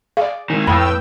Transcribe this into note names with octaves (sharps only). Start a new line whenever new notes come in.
G#4 D5 F5
G#2 D#3 G#5
F2 A2 B4 F5 G5 B5 D#6 E6